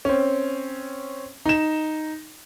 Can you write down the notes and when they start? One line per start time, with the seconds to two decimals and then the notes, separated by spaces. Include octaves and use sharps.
0.05 C4 C#4
1.46 D#4 E7